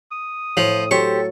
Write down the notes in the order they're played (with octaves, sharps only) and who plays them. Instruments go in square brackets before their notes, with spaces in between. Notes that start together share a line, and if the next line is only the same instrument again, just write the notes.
[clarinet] D#6
[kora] A2 [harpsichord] F3
[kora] F#3 [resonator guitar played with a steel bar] G4 C5 [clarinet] A4 [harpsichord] C#6